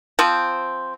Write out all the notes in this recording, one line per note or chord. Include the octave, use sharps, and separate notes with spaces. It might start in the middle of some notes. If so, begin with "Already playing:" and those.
F3 C4